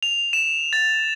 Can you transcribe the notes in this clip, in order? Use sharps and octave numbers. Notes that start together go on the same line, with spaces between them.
F7
E7
A6